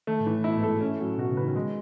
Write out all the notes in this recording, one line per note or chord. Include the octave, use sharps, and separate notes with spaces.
D#3 A3
A2
E3
A2
B2 E4
G#2
A4
A2
A2 C#4
A2 F#3
B2 F#4
C#3
B4
D#3
F#3 G#3